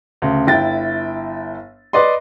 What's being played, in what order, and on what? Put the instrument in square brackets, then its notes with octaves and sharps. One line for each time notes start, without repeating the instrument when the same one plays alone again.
[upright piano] D2 C#3
G1 E4 G5 A6
B4 D5 D#5 C6